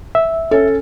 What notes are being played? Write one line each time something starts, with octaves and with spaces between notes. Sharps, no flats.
E5
C#4 A4